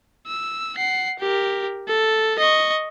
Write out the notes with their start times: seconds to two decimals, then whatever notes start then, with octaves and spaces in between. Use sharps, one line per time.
0.27 E6
0.76 F#5 C7
1.19 G4 A#4
1.88 A4
2.39 D#5 C#6